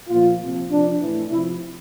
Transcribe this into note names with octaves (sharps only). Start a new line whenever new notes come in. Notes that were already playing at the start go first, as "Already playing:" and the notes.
A#2 F3 F4
C3 F3
C3 F3 D4
A2 E3
C3 F3 E4